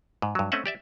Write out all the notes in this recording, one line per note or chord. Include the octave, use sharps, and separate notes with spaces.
G#2
G2 F#3
A3 C4 C#4 D#5 E5 F#5
G4 D5 E5